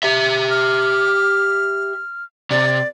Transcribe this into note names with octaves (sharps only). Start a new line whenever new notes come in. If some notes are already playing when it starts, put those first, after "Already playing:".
G4 E5
F6
C3 D5